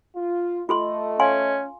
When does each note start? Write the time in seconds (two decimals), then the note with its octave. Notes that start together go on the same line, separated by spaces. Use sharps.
0.16 F4
0.69 A3 F4 A4 D#5 C6
1.20 C#4 F5 G#5 C6